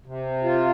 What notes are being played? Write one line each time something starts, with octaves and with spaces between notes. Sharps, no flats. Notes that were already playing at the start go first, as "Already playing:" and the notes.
C3
F4